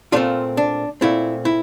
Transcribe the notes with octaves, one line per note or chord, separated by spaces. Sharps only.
A#2 A3 C4 D4 F4
D4
A#2 A3 C4 E4
E4